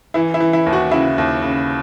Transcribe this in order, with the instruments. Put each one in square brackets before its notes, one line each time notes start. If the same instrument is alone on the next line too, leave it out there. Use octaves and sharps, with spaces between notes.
[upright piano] E3 E4
E4
E3
E4
D#2
F#4
C#3 E4
D#2
C#3